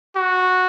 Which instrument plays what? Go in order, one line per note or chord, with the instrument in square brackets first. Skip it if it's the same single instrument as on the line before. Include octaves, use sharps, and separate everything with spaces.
[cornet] F#4